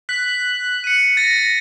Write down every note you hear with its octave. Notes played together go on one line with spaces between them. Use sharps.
F#6 B6
C#7 D#7
A6 A#6